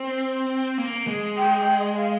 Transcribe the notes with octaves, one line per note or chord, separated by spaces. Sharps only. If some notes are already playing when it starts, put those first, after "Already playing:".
Already playing: C4
A#3
G#3
G5
G5
D#5
F5